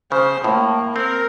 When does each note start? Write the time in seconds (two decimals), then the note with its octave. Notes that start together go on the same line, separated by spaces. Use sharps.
0.12 C#3 C5
0.44 A2 A#3
0.96 C4 A#4